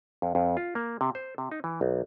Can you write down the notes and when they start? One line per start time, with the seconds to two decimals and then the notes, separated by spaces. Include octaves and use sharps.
0.22 F2
0.35 F2
0.57 F4
0.75 A#3
1.01 C3
1.15 C5
1.38 C3
1.52 D#4
1.64 E3
1.81 B1